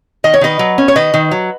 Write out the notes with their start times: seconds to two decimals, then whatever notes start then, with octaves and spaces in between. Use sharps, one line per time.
0.24 D#3 D#5
0.34 C#5
0.41 D#3 B4 D#5
0.59 F#3
0.78 C#4
0.88 C#5
0.96 D#3 B4 D#5
1.14 D#3
1.31 F#3